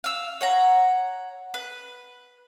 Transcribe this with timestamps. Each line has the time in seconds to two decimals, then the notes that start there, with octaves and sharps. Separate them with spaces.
0.04 F5 E6
0.41 C#5 F#5 A#5
1.54 B4